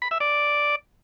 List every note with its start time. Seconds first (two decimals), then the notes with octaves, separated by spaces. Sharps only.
0.02 B5
0.11 E5
0.20 D5